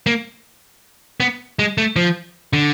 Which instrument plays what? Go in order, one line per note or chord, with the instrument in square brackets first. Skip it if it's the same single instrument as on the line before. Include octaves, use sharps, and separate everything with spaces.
[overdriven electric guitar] A#3
B3
G#3
A3
F3
D3